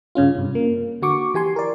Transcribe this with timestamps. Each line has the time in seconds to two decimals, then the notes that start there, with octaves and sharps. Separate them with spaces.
0.15 G2 C#3 C#4 F4
0.35 G2 C3
0.55 A#3
1.02 D3 F#4 C#6 D6
1.34 E3 G4 G#5 C6
1.56 A#4 D5